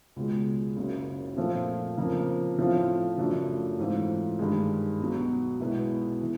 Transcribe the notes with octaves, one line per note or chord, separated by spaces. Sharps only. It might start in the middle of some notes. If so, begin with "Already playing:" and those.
C#2 B2 G#3
F#1 F#2 C#3
A#2 F3 A3 C4 F4
F2 C#3 F3 A#3
A2 F3 A3 C4 F4
F#2 C#3 F3 A3 D4
G#2 E3 A3 C4 F4
G2 D#3 G#3
B1 B2 F#3
B1 B2 G#3 B3 E4
E3